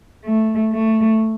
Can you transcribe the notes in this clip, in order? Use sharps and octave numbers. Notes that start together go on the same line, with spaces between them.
A3
A3